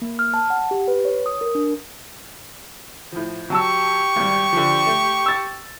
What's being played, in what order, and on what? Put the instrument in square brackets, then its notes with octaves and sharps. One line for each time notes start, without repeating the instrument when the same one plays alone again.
[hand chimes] A#3
F6
A5
F#5
G4
B4
C#5
D#6
A#4
D4
[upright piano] A2 F3
[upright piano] F#3 A5 E6 [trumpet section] G4 C#6
[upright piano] G#1 G3
D3 F3
A3
E6 A6